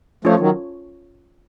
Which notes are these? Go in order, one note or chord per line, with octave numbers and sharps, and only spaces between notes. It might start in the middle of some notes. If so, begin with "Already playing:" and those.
F3 A3 C#4 F4 A4 C#5
D#3 F#3